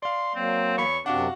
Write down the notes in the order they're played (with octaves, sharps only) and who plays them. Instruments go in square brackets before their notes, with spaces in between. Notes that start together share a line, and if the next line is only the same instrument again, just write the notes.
[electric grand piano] D5 F5 [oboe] C6
[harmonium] F#3 A#3 [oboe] C4
[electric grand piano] E2 C#5 B5 [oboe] C#6
[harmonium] F#2 C3 C4 [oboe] D4 [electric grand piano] F#4 F5 F#5